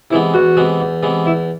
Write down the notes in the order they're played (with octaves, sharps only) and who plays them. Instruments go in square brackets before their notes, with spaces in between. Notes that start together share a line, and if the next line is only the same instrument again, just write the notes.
[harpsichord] C3 E3 G#3 B3 [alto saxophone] E4
[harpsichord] E2 [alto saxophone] F#4
[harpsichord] C3 E3 G#3 B3
E2
C3 E3 G#3 B3
[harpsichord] E2 [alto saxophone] E4